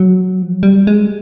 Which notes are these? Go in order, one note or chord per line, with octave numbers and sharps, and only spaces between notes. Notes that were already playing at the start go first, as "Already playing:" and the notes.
Already playing: F#3
F3
F#3
G3
G#3